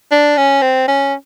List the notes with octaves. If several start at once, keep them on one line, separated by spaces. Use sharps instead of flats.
D4
C#4
C4
C#4